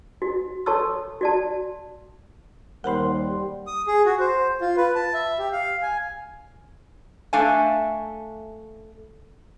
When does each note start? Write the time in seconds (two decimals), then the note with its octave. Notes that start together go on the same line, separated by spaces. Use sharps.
0.22 F#4
0.66 A4 C#5 A5 C6 C#6 E6
1.21 F#4 D5 A5
2.84 D#2 G3 A#4 C5 F#5 B5 C6
3.67 D#6
3.87 G#4
4.05 F#4
4.20 C5
4.61 F4
4.77 B4
4.95 A5
5.14 E5
5.39 G4
5.52 F5
5.82 G#5
7.33 A3 D4 A4 E5 F5 G#5